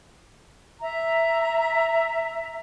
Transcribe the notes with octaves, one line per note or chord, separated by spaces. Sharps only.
E5 A#5